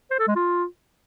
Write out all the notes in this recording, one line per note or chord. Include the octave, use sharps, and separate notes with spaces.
C5
A4
G#3
F4